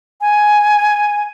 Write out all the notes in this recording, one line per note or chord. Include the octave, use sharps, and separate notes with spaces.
G#5